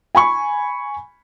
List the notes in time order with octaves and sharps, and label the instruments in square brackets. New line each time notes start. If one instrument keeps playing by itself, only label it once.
[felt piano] G#5 B5 C#6